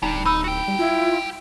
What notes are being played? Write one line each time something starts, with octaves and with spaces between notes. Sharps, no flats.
D1 G3 D4 D#4 A#5
D#4 B5 E6
F#4 G5
G3
E4 F4